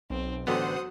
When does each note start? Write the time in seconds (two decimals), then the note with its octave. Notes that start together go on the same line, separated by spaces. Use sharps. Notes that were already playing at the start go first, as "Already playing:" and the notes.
0.10 B1 C4
0.47 A1 D3 F#3 B3 C5 F#5 D#6